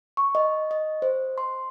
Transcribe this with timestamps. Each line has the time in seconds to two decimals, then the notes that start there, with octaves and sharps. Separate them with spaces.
0.17 C#6
0.35 D#5
0.71 D#5
1.02 C5
1.38 C6